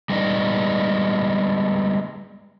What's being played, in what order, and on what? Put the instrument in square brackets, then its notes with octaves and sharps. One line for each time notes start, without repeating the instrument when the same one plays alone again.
[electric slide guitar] G3 G#3 B3 D#4 D5